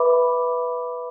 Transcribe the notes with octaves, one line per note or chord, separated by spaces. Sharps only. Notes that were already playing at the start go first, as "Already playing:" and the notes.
Already playing: B4 E5 B5 D6